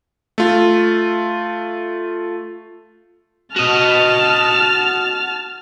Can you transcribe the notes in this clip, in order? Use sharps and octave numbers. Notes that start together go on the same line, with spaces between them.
A3 F4
F#4 D#5 A5 F6